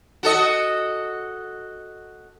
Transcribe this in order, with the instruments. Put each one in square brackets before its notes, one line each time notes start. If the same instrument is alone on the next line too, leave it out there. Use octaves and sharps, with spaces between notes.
[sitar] F#4 A4 D#5